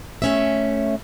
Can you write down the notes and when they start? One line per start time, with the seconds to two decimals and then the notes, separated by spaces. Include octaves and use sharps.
0.22 A3 C#4 E5